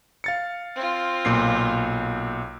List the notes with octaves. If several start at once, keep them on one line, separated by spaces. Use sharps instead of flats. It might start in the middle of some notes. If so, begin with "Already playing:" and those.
F5 A6 C#7
C4 F4
B1 A#2 C7